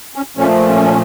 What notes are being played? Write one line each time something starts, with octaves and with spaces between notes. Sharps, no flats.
C#4
A#2 F3 A3 C#4
C#4